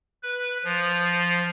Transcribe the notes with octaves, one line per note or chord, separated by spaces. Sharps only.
B4
F3